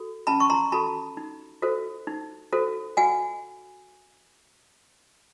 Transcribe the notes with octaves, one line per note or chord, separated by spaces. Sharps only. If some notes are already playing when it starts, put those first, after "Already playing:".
Already playing: F#4 A4
C#4 A5 B5
C#6
A#5 C6
F#4 A4 A5 B5
D#4
F#4 A4 C5
D#4
F#4 A4 C5
F#4 F#5 G#5